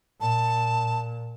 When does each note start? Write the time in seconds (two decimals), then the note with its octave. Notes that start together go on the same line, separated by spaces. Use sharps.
0.21 A#2 A5